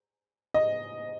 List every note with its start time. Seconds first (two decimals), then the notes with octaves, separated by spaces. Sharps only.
0.54 D#5